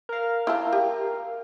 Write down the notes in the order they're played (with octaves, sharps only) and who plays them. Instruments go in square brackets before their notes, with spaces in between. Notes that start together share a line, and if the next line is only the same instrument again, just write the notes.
[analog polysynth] A#4 F5
[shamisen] E4 F4 A5
G4